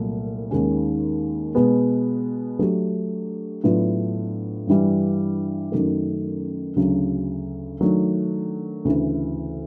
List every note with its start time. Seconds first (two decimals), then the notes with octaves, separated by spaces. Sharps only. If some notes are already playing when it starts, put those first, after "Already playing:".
Already playing: C2 A#2 F#3 A3
0.51 D#2 D#3 G#3 C#4
1.55 B2 G#3 B3
2.59 F#3 A3 D4 G4
3.64 A2 F#3 B3 D4 F4
4.67 G2 E3 G3
5.72 F#2 D#3 F#3 A3
6.76 D2 C#3 F#3
7.81 D#3 F#3 A3 D4
8.85 D2 C#3 E3